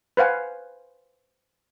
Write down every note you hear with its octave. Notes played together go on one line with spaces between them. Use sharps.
B4 C5 F5 F#5 G#5